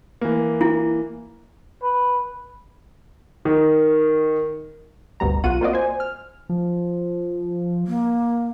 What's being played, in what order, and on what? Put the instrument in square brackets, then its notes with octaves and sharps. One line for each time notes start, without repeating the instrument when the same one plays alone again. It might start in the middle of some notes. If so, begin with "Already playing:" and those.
[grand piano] E3 A#3
[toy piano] E4
[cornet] B4
[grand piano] D#3
[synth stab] G1 D2 B2 G3 A#5
B1 B2 F4 F#4 F#5 D#7
A#3 C4 F4 F#4 D5 D#5
C5 G#5
F6
[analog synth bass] F3
[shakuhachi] A#3